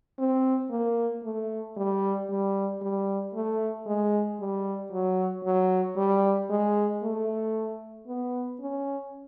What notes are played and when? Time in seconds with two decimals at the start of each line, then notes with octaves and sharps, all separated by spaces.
0.19 C4
0.71 A#3
1.24 A3
1.77 G3
2.30 G3
2.82 G3
3.34 A3
3.87 G#3
4.40 G3
4.92 F#3
5.45 F#3
5.97 G3
6.50 G#3
7.03 A3
8.08 B3
8.61 C#4